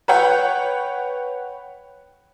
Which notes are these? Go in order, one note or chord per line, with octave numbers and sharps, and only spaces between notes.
B4 C#5 F#5 G5 B5